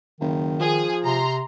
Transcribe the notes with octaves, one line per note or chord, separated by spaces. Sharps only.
F#1 D#3
F3 G#4
C3 A#5 C6